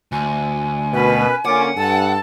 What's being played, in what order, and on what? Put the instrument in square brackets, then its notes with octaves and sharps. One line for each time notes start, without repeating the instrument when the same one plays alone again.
[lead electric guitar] D2 [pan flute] G#5
[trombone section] B2 [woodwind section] C#4 A#4 B4
[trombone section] D3 A#3 C#4 [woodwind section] F4 D6 [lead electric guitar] F#5
[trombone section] G2 [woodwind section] A4 A5